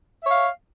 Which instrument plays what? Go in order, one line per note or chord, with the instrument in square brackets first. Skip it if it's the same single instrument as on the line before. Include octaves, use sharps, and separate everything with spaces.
[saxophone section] E5
C#5
F5